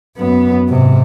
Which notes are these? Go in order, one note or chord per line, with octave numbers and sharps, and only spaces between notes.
F#2 B3
G#2 C3